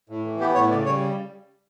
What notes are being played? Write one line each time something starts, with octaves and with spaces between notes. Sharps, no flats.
A2
E3
B3 G4
A2 C#5
C#3 D5
G3 C#5